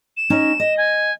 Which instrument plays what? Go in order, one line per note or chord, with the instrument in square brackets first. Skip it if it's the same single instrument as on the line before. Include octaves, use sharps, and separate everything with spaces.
[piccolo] E7
[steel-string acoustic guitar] C#4 D#4 C#5
D#5
[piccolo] G#5